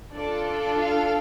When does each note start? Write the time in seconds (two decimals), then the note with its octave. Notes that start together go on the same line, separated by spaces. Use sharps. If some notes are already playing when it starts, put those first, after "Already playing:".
0.14 D4 F4 A4 D5
0.45 D5
0.76 F5